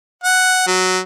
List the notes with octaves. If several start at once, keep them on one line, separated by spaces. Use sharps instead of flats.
F#5
F#3